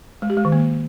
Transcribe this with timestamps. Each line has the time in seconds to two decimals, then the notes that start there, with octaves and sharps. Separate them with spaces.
0.22 G#3
0.30 G4
0.37 G#3
0.45 D#3
0.52 A#3